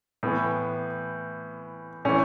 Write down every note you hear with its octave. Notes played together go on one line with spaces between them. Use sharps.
A2 E3 B3
A2 E3 C#4